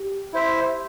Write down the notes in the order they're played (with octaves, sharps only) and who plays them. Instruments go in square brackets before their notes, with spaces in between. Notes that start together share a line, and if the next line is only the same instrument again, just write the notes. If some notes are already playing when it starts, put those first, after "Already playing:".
Already playing: [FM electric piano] G4
[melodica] E4 C5 E5